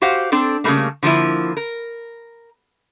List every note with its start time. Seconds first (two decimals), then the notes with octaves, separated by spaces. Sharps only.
0.02 F#4 G4 C5 F5 F#5
0.32 C4 D4 A4
0.64 C#3 E3 G3 A3 A#3
1.03 D3 F3 G3 A#3 E4
1.57 A#4